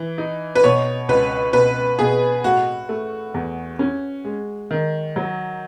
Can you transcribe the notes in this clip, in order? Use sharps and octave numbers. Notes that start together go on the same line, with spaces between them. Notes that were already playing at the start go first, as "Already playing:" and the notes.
Already playing: E3
D#4
B4
B2 C#5
C#2 B4
B2 B4
B2 G#4
A2 F#4
A3
E2
C#4
G#3
D#3
F#3